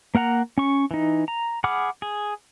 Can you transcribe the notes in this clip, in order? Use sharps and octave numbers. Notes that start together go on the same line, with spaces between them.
A#3 A#4 F#5 A#5
C#4 C#6
E3 D#4
A#5
G#4 F#5 B5 D6 F6
G#4